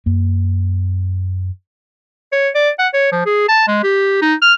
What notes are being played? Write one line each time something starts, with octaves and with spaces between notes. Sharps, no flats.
F#2 A#3
C#5
D5
F#5
C#5
F3
G#4
A5
G#3
G4
D#4
F6